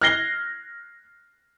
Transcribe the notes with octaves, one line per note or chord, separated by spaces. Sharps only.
F6 F#6 G#6 A#6 C7 G7